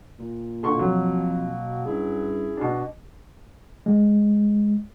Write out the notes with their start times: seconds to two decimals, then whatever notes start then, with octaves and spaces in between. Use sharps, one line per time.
0.19 A#2
0.63 B2 D3 A#3 C6 C#6
0.79 F2 F#3
1.86 G2 C#4 E4 G#4
2.57 B2 D4
3.86 G#3